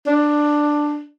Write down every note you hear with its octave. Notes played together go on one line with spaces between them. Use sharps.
D4